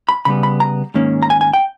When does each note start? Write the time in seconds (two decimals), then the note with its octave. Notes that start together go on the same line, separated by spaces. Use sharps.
0.09 B5
0.25 C#3 G3 B3 B5
0.43 B5
0.60 A#5
0.94 G#2 D#3 A#3 C#4
1.23 A#5
1.30 G#5
1.41 G#5
1.53 G5